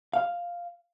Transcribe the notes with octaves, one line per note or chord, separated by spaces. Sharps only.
F5